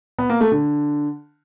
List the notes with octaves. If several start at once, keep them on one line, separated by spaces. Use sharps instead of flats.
B3
A#3
A3
D3